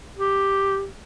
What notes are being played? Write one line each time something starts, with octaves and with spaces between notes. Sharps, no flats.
G4